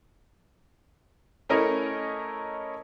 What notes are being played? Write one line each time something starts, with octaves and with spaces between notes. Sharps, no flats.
A3 C#4 E4 A#4 D#5